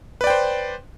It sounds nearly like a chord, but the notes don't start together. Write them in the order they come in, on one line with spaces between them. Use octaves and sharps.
B4 D5 G5 C5